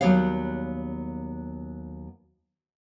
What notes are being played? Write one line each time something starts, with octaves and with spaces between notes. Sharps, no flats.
D#2 F#3 G3 B3 C#5 F5